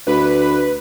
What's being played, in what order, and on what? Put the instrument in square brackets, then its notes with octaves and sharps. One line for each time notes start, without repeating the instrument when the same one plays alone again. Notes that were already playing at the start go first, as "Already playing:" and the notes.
[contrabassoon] D2 [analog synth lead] B4